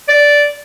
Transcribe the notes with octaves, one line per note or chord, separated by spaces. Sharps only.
D5